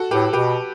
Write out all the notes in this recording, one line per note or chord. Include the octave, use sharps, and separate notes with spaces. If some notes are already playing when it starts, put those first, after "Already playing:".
Already playing: F#4 A4
A2 G4 B4
B2 G4 B4